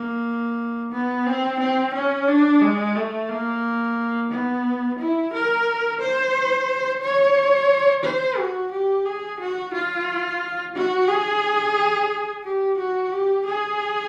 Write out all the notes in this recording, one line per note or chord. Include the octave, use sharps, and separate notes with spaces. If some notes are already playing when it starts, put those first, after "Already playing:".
Already playing: A#3
B3
C4
C4
C#4
D4
G#3
A3
A#3
B3
E4
A#4
C5
C#5
C5
F#4
G4
G#4
F#4
F4
F#4
G#4
G4
F#4
G4
G#4